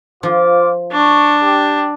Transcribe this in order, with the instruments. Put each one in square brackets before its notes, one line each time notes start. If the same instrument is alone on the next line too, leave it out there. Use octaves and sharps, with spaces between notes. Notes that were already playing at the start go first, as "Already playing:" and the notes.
[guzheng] F3 [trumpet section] F4 C5 D6
[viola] D4 [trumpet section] C#6
[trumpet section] G4